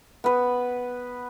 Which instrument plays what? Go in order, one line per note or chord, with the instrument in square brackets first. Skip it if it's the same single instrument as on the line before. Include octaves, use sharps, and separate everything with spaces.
[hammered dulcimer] B3 B4